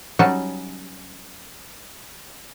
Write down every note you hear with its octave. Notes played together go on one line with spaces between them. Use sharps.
F#3 G3 C#4 D#4 F#4 A5